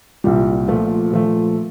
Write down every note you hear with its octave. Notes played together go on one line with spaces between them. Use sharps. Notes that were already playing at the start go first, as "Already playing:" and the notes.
C2 A#2 G3
A#2 F3 A3
A#2 F3 A3